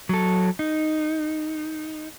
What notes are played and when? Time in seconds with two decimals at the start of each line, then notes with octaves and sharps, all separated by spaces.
0.09 F#3 A4
0.59 D#4